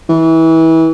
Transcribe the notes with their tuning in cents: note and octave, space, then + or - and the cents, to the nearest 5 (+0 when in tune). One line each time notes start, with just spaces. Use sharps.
E3 -25